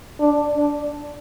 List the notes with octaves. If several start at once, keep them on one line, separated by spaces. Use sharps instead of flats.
D4
D4